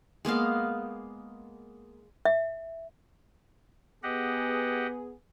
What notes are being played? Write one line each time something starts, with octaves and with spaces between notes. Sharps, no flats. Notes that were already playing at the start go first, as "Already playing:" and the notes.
G#3 A#3 B3 F5
E5
B3 G4 G#4 D#5 F#5